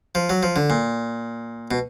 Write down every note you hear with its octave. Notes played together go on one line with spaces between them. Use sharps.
F3
F#3
F3
D3
A#2
B2